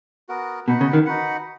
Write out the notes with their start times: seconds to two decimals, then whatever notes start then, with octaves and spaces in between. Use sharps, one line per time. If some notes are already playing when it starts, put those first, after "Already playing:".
0.29 B3 F#4 A#4
0.68 B2 D#4 F#4 B4 F#5
0.81 C#3
0.93 D#3
1.06 D#4 F#4 B4 F#5